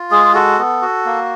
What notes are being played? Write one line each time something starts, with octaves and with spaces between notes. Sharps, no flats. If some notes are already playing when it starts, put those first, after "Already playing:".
Already playing: F4
G#3 G#4
F#4 A4
B3
F#4
A#3